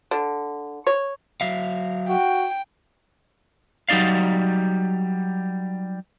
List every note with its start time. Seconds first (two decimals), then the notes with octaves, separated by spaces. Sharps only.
0.11 D3
0.87 C#5
1.41 F#3 E5 F5
2.09 F#4 G5
3.89 F#3 G3 D#4 D5 F5